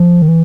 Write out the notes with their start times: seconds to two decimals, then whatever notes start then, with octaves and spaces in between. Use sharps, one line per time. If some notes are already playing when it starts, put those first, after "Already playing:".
Already playing: F3
0.22 D#3
0.28 E3